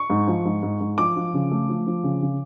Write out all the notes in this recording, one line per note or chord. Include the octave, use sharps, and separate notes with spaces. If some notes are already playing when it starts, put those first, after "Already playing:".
Already playing: C#6
G#2
F3
G#2
G#2
G#2
F3 D6
F3
C#3
A3
F3
F3
C#3
C#3